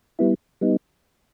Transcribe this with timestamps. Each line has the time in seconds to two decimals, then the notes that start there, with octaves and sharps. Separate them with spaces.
0.19 G3 B3 E4
0.61 G3 B3 D#4